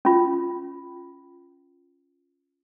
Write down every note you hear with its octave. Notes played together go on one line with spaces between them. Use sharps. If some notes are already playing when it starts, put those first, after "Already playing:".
C#4 F4